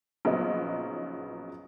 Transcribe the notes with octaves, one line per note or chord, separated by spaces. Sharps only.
A#1 C#3 F#3 B3 D#4 D#5